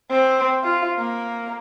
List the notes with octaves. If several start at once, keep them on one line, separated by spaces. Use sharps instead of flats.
C4
F4
A#3